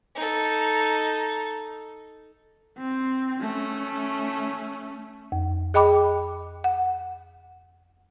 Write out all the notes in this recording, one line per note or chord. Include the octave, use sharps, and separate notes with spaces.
D#4 A4
C4
A3 C#4
F2
G#4 D#5 G5 B5 D6
F#5